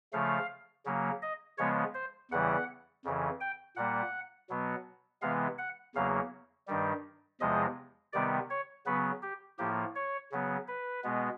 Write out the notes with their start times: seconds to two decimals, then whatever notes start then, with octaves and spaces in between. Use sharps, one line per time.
0.13 C#3 F3 A3 F5
0.86 C#3 F#3 A#3
1.22 D#5
1.58 C#3 F3 G#3 B3 C#5
1.94 C5
2.31 E2 C#3 E3 G3 F#5
3.05 F2 C#3 E3
3.41 G5
3.76 A#2 G3 A#3 F#5
4.50 B2 F#3 B3
5.22 C3 E3 G#3 B3 F5
5.58 F#5
5.95 E2 C#3 F#3 A#3 F5
6.67 G2 D#3 G3
7.40 E2 C3 F3 G#3 D#5
8.13 C3 D#3 G3 B3 D5
8.50 C#5
8.86 C#3 F#3 B3 B4
9.23 G4
9.59 A2 F3 A#3 G4
9.95 C#5
10.32 C#3 F#3 B3
10.68 B4
11.04 B2 G#3 B3